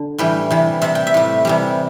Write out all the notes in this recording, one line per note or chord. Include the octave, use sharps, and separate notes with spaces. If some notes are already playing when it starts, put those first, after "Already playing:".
Already playing: D3
A2 E3 G3 G5
C3 E3 G3
C3 G3 E5
G5
E5
A2 G3
C3 E3 G3